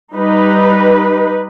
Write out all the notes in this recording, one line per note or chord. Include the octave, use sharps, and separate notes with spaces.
G3 D#4 B4